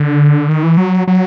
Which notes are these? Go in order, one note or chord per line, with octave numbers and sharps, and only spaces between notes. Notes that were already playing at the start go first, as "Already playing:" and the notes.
Already playing: D3
D#3
E3
F#3
F#3